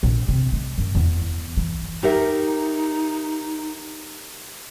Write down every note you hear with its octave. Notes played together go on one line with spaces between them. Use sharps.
A#1
C3
G#3
F#2
E2
E3
D#4 G4 A#4 E5